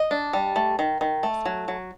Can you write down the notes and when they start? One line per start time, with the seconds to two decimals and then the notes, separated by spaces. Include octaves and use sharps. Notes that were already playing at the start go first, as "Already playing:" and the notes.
Already playing: D#5
0.11 D4
0.33 G3
0.56 A3
0.79 D#3
1.01 D#3
1.23 A3
1.46 F#3
1.68 F#3